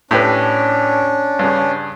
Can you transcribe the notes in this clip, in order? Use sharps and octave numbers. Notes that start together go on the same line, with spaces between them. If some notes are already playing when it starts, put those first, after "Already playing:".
A2 C#4 D4 G4 B4
G2 C#3